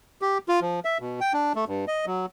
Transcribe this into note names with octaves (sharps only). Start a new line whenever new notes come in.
G4
F4
F3
E5
B2
G5
D4
A3
G2
D#5
F#3